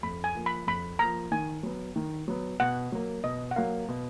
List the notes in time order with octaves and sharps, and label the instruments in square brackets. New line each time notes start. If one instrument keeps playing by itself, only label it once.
[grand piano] F2 [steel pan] B5
[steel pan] G#5
[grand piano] F3 A#3
[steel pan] B5
[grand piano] F2 [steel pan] B5
[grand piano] F3 A#3 [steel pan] A#5
[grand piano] D#3 [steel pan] G#5
[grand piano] F#3 B3
D#3
F#3 B3
[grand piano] B2 [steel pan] F#5
[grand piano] F#3 A#3
[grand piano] B2 [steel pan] D#5
[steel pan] F#5
[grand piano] F#3 A#3 [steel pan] F5
[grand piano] B2